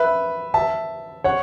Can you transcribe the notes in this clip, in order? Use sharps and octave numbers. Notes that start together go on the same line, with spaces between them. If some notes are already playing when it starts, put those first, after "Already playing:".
Already playing: B4 E5
E5 A5
C#5 F#5